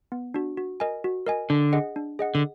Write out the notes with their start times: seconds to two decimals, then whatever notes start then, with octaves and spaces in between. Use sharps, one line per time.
0.12 B3
0.34 D4 F#4
0.57 F#4
0.80 A#4 D#5 G#5
1.04 F#4
1.26 A#4 D#5 G#5
1.50 D3 D4
1.73 G#4 D#5 F#5
1.96 D4
2.19 G#4 D#5 F#5
2.35 D3